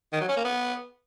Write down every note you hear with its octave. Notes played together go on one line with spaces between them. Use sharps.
D#3
F#3
C#4
A#3
B3